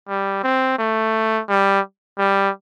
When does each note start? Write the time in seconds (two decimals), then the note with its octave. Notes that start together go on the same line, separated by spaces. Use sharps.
0.09 G3
0.43 C4
0.79 A3
1.49 G3
2.18 G3